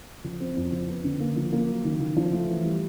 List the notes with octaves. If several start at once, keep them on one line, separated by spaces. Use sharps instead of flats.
F3
C4
F2
F3
B3
D3
A#3
F3
A#3
F#3
D#3
D#3
F3
A3
E3
G3